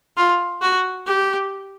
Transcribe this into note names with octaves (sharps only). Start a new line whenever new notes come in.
F4
F#4
G4